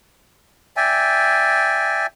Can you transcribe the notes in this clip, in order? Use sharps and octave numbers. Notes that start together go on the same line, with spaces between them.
D5 E5 G5 G#5